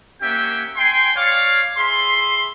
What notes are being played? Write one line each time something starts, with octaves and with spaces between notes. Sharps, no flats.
A#3 C#4 G4 E5 F#5 G5
G5 G#5 C6
C#5 D5 F5
G#4 E5 B5 C6